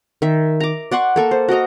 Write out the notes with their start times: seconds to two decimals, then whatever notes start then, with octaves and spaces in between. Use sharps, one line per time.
0.22 D#3 E5
0.60 A#5 D6
0.91 D5 F#5 C6 C#6
1.16 A#3 A4 C#6
1.31 C5
1.49 F#4 A#4 D#5 A#5